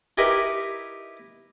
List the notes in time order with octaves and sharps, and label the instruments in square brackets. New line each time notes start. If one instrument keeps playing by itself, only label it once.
[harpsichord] D#4 E4 G4 A#4 B4